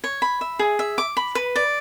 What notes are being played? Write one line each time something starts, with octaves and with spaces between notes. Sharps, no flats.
C#5
B5
E5
G#4
E5
D6
B5
B4
D5